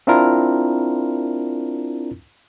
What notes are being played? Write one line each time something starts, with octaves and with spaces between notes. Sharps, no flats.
C4 D4 E4 F4 A#4